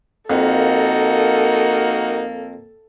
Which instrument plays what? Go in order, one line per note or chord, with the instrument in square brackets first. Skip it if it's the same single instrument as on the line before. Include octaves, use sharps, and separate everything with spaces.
[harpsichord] F2 [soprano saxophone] A#3 [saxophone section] D#4 F#4 A#4 [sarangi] A4